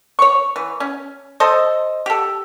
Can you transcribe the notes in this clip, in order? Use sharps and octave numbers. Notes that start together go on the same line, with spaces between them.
C#5 C#6
E3
C#4
A4 C5 D#5
G4 A4